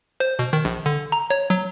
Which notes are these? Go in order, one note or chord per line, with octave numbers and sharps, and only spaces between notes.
C5
B2
D#3
A#1
D3
A#5
C#5
F#3